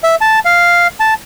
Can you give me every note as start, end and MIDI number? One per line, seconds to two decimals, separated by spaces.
0.04 0.16 76
0.21 0.39 81
0.45 0.87 77
1.00 1.14 81